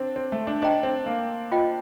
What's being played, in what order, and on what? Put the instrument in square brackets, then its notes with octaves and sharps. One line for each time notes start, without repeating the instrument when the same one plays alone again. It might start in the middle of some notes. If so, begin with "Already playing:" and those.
Already playing: [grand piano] C4 D4
C4
A3
D4
[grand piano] D4 [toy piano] C5 D#5 G5 A#5
[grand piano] C4
A#3
[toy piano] F4 C5 D#5 G5